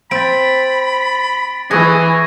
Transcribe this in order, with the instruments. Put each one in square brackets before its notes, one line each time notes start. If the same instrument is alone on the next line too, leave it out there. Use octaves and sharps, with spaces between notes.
[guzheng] C4 [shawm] B5 [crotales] A6 D7
[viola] E3 [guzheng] G#4 [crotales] C#6 G#6 A#6